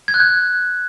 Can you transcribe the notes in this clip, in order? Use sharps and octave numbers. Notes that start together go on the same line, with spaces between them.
G#6
F#6
G6